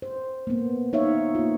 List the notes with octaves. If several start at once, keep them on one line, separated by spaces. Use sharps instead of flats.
C5
A#3 B3
D#4 C#5 E5 F5
A#3 F4